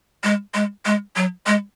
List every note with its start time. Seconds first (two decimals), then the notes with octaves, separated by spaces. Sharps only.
0.24 G#3
0.54 G#3
0.85 G#3
1.16 F#3
1.47 G#3